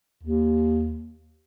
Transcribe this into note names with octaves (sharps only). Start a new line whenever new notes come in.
D#2